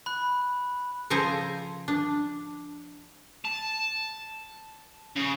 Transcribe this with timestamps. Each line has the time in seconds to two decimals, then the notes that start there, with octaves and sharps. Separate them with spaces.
0.06 B5 F#6
1.10 C#3 F3 A4 C5 G#5 A#5
1.88 D4
3.45 A5
5.16 C#3